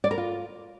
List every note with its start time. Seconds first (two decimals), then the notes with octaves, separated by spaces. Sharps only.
0.04 D5
0.11 A#4
0.18 F4